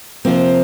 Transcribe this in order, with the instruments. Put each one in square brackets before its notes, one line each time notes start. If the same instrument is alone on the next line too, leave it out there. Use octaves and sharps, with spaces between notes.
[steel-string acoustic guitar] C3 F3 A#3 C4